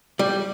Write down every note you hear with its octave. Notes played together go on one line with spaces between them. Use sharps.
G3